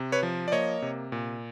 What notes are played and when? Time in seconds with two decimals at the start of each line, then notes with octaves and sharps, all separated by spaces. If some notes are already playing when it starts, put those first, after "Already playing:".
Already playing: C3
0.12 B4 C#5
0.23 F3
0.48 D5
0.52 A#3 C#5 D#5
0.82 C3
1.12 A#2